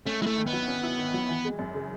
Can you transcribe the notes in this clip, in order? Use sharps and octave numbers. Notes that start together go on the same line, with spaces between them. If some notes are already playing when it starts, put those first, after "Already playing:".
A3 C#4
G#3 E4
A3
D#3
B3
F#3
C#4
E4
D#3
F#3
E3
G#3
F#2
C#3